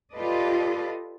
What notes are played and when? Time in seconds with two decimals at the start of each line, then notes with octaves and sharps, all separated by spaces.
0.13 F4 G4 A4 B4 D5 D#5